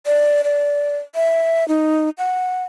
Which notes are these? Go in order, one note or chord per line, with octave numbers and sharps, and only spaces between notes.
D5
D5
E5
D#4
F#5